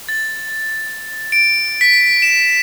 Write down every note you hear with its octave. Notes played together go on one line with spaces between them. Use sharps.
A6
D7
B6
E7